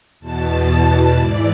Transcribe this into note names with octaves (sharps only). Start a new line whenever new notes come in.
E2 B2 A5
G#2 E3 D5